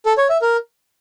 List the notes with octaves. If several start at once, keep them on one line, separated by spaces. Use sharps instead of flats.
A4
C#5
E5
A#4